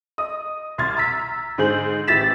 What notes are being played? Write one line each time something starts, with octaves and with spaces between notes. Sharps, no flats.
D#5 D#6
C2 C6 F6 G#6 A6
A#5 E6 B6
G#2 D3 G#4 C5 G6 F#7
A1 E4 G4 A6 B6 E7